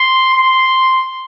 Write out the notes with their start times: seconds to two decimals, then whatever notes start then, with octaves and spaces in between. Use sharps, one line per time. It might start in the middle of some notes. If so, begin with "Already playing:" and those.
Already playing: C6
0.33 C6